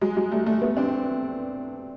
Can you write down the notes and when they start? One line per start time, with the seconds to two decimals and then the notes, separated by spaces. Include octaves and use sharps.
0.01 F#3 G#3
0.16 F#3 G#3
0.31 G3 A3
0.46 G3 A3
0.62 A3 B3
0.77 C4 D4